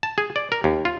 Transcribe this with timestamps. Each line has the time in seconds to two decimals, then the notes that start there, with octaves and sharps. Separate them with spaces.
0.03 A5
0.18 G#4
0.36 D5
0.52 A#4
0.64 D#2
0.85 F4